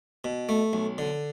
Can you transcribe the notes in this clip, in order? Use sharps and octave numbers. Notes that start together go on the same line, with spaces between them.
B2
A3
B1
D3